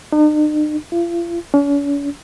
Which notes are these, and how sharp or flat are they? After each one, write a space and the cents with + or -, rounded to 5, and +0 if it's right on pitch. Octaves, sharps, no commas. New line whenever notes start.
D#4 -45
F4 -40
C#4 +45